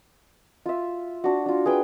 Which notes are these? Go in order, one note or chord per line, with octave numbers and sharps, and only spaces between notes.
F4 E5
D4 F#4
D4 F4
G#4 B4 G5